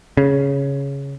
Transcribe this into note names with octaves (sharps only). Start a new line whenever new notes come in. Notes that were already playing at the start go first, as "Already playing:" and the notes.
C#3